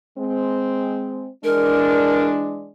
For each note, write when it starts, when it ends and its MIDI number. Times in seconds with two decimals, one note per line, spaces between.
0.17 1.28 56
0.17 1.28 60
1.44 2.72 52
1.44 2.72 56
1.44 2.72 62
1.44 2.25 70